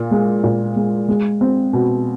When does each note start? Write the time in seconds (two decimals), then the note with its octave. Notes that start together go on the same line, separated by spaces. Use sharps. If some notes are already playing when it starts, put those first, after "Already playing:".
Already playing: A#2
0.11 G#3
0.44 A#2
0.76 G#3
1.08 G#3
1.41 C4
1.73 B2